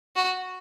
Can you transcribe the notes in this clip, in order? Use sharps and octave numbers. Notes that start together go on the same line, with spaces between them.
F#4